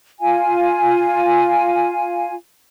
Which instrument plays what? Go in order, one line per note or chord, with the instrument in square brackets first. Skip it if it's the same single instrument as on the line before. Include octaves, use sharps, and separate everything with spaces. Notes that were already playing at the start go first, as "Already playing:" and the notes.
[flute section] F4 F5 G#5